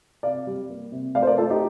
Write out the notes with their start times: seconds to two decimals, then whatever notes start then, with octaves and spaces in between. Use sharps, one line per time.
0.23 C3 D5 F5
0.47 G3
0.70 A#3
0.92 C3
1.15 A3 D5 F5
1.23 C5
1.27 A#4 D5
1.38 A3 F4 A4
1.50 D#4 G4